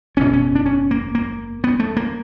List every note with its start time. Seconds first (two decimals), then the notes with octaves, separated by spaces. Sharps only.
0.17 F#1 E2 B2 C#4
0.33 C#4
0.55 D4
0.66 C#4
0.91 A#3
1.15 A#3
1.64 B3
1.80 A3
1.97 A#3